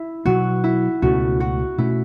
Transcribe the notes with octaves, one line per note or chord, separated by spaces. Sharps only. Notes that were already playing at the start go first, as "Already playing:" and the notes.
Already playing: E4
B2 F#3 B3 F#4
E4
C#2 B2 A3 C#4 F#4
F#4
B2 A3 C#4 E4